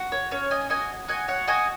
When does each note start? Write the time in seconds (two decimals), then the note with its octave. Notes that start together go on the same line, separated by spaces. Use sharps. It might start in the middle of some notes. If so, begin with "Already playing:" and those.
Already playing: F#4
0.12 C#5
0.31 C#4 C#5
0.51 D#5 G#5
0.70 F#4 D#5 G#5
1.08 F#4 D#5 G#5
1.28 C#5 F#5
1.48 F#4 D#5 G#5